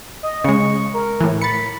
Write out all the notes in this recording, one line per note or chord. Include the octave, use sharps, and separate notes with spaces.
D#5
C#3 G#3 C#6
A#4
A2 E3
B5 A6 C#7